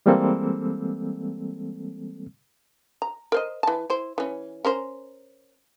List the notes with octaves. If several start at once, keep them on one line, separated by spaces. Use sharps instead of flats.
E3 G3 G#3 A#3 C4 A4
A#5
A#4 C5 D#5
E3 A5
E4 C5
E3 C#4
C#4 A#4 C5